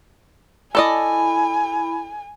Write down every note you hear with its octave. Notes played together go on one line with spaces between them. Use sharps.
E4 A4 D5 D#5 G#5 B5